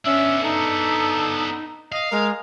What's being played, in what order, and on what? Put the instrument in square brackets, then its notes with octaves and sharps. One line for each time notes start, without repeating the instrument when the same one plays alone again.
[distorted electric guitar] B3 D4 [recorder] C#4 [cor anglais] E5
[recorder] D#4 [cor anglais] A4
[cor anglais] D#5 [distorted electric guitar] F5
[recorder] G#3 [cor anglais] A#4